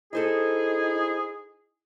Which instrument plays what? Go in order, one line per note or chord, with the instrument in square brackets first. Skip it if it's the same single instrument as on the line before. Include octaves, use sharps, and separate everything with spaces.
[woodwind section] D#4 E4 G#4 [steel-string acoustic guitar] A4 C5 D#5